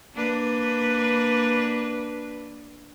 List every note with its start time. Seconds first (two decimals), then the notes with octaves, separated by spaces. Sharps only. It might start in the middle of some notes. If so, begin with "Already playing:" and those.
0.14 A#3 D4 B4